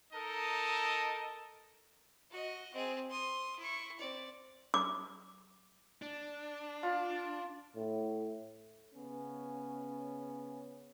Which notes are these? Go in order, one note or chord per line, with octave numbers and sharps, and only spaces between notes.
D#4 A4 A#4 D#5 A5
F#4 D#5
C4 G#4
C6 D#6
E4 C#6
C4 D5
D6
D4
F4
A2
C#3 B3 C#4